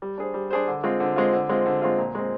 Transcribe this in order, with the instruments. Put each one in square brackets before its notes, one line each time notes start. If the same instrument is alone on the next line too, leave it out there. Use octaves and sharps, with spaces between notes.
[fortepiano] G3
D4 G#4 C5
G3
D4 G#4 C5
D3
G#3 C4 F4
D3
G#3 C4 F4
D3
G#3 C4 F4
D3
G#3 C4 F4
A#2
G#3 C4